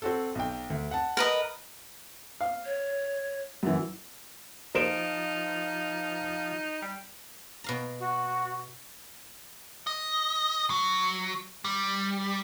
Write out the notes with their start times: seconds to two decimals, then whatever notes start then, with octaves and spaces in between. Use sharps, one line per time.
0.02 C4 F#4 A4
0.35 B1 G5
0.70 D2
0.91 F#5 A5
1.17 A#4 B4 D#5
2.41 F5
2.66 C#5
3.63 F#2 E3
4.75 F3 D#4 C5 D7 E7
6.82 G3
7.64 B2 F5 A#5
7.99 F#4
9.87 D#5
10.70 F#3
11.65 G3